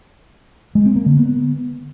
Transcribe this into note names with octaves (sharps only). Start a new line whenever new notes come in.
G#3
C4
A#3
D3
B3